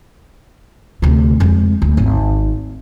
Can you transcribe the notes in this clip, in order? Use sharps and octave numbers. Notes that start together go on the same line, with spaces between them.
D2 C3
F2 G#3
D2
G#1